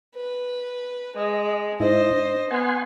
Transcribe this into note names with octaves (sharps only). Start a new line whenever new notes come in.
B4
G#3 D#5
G#2 D#4 E4 C5 D#5
D4
B3 F#5 G#5 C6